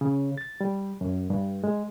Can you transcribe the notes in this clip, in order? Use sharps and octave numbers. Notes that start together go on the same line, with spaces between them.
C#3
A6
G3
F#2
G2
G#3